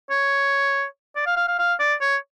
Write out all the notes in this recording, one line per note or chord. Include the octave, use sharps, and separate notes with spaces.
C#5
D5
F5
F5
F5
F5
D5
C#5